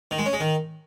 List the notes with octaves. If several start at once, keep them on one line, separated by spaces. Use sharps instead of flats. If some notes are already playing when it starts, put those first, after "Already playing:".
D#3
G#3
C#4
G#3
D#3